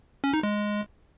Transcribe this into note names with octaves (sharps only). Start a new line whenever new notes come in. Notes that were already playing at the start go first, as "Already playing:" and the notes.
C#4
D#4
G#3